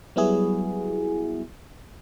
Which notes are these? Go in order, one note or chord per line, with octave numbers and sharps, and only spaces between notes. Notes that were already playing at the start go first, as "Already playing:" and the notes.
F#3 G3 B3 E4 F#4 G#4